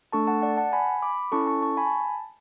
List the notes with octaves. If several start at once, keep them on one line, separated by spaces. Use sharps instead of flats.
A3 D4 A4 A5 C#6
F#5 A5
D5 F#5
F#5 A5
G#5 B5
B5 D6
C#4 E4 A4 A5 C#6
A5 C#6
A5 C#6
G#5 B5
A5